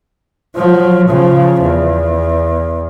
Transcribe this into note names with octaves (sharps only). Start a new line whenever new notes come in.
F3 F#3
C#3 F3
E2